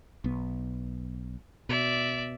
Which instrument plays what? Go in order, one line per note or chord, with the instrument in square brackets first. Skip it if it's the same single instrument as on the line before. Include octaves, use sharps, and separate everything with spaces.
[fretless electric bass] B1 B3
[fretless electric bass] B2 [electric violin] D5 E5